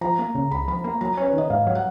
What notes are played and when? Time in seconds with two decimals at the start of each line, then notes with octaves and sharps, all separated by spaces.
0.01 F3 A#5
0.19 A#3
0.35 C#3
0.51 C#2 B5
0.68 F3 B5
0.84 A#3 A#5
1.01 F#3 A#5
1.17 C#4 B4
1.26 C#5
1.34 D#3 D#5
1.50 G#2 F5
1.67 F#3
1.75 F#5